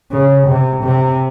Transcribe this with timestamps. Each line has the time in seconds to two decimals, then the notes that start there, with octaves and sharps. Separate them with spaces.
0.11 C#3
0.48 C3
0.84 C3